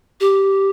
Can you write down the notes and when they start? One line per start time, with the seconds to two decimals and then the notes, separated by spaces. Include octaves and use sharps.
0.20 G4